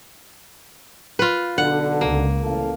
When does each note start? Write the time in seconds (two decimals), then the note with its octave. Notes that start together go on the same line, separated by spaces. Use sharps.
1.19 F4 B4
1.58 B1 D3 F#5
2.01 C#2 A#3
2.43 A1 A4 F5